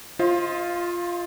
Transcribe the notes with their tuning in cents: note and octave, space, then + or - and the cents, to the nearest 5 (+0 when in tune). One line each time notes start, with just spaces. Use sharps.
F4 +0 C5 +30 D#5 +35